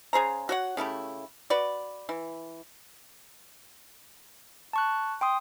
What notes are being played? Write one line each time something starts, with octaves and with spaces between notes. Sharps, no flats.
C#3 G#4 C5 A#5
F#4 C#5 F#5
C#3 A3 E4 G4
F#4 B4 D5
E3
A5 C#6 F#6
G5 C6 D#6